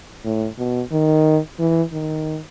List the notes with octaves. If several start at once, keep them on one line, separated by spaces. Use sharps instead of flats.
A2
B2
D#3
E3
D#3